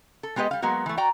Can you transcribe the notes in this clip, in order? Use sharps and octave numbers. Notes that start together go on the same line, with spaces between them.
A4
G#3 B3 G4 B4 D#5
G3 F5
F#3 G#3 A#3 B3 F#4
E3 A3
F#4 D5 G5 A#5